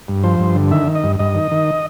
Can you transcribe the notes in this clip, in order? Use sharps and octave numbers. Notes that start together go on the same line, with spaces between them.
G2
F3 C5
G2
D3
D#3 E5
D#3
D#5
G2
G2 D#5
D#3
D#3